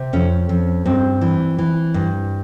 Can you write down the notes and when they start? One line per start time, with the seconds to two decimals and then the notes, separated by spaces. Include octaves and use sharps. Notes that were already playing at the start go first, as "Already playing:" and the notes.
Already playing: C3
0.13 F2 C#4
0.49 F2
0.85 G2 C4
1.21 E3
1.59 E3
1.94 G2